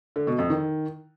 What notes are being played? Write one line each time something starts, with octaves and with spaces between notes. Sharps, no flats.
D3
B2
F2
D#3